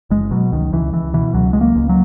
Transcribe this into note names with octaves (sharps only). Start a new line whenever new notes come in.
F#1 G#3
B2 F#3
C#2 D#3
C#2 E3
C#2 E3
B2 E3
C#2 F#3
C#2 G#3
A#3
C#2
F#3